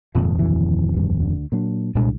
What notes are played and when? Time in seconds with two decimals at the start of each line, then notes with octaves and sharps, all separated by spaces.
0.15 D#1 F2 G#2 C3 F3
0.38 D2 E3 F#3
0.94 D2 G2
1.17 D2 D3
1.52 A#2 F#3 D4
1.95 C2 A#2 G#3 D4